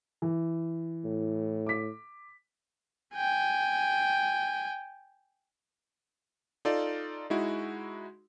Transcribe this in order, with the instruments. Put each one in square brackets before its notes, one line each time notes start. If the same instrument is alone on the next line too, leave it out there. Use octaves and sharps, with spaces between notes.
[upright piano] E3
[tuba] A2
[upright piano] D6 B6
[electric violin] G5 G#5
[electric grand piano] D#4 F4 A4 D5
G#3 D#4 E4 F#4